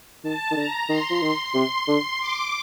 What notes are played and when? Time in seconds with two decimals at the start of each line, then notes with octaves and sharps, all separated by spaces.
0.23 D#3 A5
0.51 D#3
0.56 D3 A#5
0.89 D#3 C6
1.10 F3
1.22 D#3
1.54 C3
1.88 D3
2.20 D6